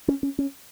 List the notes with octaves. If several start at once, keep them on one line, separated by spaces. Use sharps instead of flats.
C#4
C#4
C#4